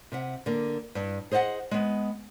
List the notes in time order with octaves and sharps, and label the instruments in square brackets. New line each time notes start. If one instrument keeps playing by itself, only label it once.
[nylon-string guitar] C3 E5 F#5
D3 A#3
G2
G#4 C5 D#5 F5 F#5
G#3 B3